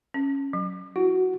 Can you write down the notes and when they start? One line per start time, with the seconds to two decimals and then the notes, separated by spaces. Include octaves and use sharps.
0.14 C#4
0.53 F#3
0.96 E4 F#4